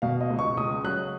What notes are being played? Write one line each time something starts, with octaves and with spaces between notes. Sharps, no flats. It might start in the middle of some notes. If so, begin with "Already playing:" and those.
B2 F5
D#5
C#2
C#6
C#2 D#6
F#3 F#6